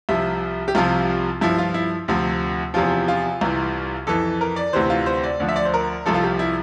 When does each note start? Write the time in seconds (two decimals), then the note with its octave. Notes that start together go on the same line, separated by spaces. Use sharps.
0.09 C2 C3 F3 E5
0.68 G4
0.75 C2 C3 F3 F4
1.41 G2 F3 E4
1.58 F4
1.74 E4
2.08 D2 C3 F3
2.74 E2 C3 F3 F4
3.08 F4
3.41 C2 C3 E3
4.07 F2 E3 A4
4.41 A#4
4.56 D5
4.73 D2 C3 E3 C5
4.90 F4
5.06 C5
5.23 D5
5.40 D2 D3 F3
5.48 E5
5.56 D5
5.65 C5
5.74 A#4
6.06 C2 C3 F3 A4
6.14 F4
6.23 G4
6.39 E4